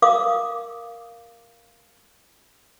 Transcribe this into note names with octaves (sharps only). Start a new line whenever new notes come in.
A#4 F5 D6 D#6